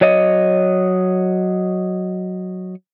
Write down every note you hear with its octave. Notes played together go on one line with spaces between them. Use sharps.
F#3 C#5 D#5